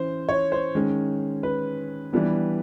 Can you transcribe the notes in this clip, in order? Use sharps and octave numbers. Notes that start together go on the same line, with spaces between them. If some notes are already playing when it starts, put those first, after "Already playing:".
Already playing: E3 C#4 C5
C#5
C5
D#3 G#3 C#4
B4
E3 G3 B3 D4